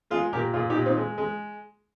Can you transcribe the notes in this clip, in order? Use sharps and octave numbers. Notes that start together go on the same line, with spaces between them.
G#3 F4 G#4
A#2 G4 A#4
A#2 F4 G#4
D#4 G4
A#2
C4 D#4
G#3
G#3